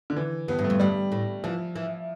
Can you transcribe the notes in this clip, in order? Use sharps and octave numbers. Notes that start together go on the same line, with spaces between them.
D3
E3
G2 B3
G2
A3
F2
G2 G3
A2
E3 F3
E3